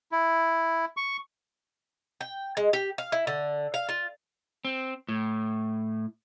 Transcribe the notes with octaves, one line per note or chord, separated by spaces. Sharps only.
E4
C#6
G5
G#3
G4
F5
E4
D3
F5
F4
C4
A2